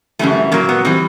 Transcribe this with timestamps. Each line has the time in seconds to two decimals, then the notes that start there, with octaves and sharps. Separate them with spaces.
0.19 F#2 C#3 E3 G3 A3
0.52 A#2 F#3 A#3
0.69 B3
0.85 E3 G3 C4